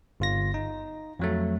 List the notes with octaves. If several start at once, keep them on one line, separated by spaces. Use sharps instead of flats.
G1 F4 A#6
D#4
F2 F#3 A3